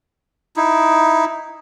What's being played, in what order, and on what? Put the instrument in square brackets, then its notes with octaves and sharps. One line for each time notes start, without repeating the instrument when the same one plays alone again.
[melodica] D#4 E4